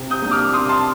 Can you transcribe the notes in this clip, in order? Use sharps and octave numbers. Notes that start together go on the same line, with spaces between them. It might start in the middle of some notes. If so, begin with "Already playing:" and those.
Already playing: C3
D#6 G6
G3 A#3 D4
D6 F6
C3 C6 D#6
A5 C6